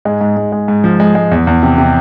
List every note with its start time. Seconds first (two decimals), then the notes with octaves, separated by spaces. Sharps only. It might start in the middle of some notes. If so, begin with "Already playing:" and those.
0.05 G#2 G#3
0.21 G#2
0.37 G#2
0.52 G#3
0.68 G#2
0.84 F3
1.00 G#3
1.15 G#3
1.32 E2
1.47 E2
1.63 C3
1.78 C3